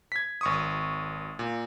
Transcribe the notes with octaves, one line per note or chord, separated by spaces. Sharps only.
G#6 B6
G#1 C#6 D#6
A#2